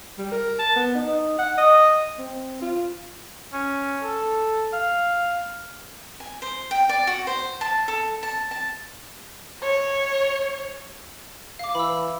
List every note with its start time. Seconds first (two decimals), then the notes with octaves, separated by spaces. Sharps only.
0.18 G3
0.32 A#4
0.59 A5
0.76 B3
0.95 D#4
1.39 F#5
1.58 D#5
2.19 C4
2.62 F4
3.53 C#4
4.03 A4
4.73 F5
6.20 G#5
6.42 C5
6.71 G5
6.89 D5
7.07 F#4
7.27 C5
7.61 A5
7.88 A4
8.23 A5
8.51 A5
9.63 C#5
11.59 F5 D6
11.75 E3 B5 E6